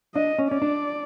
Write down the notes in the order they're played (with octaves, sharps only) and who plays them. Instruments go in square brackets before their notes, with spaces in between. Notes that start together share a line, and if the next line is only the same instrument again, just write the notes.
[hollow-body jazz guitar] D4 [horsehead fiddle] D#5
[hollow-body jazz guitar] C#4
[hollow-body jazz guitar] C#4 [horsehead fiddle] D5
[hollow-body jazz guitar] D4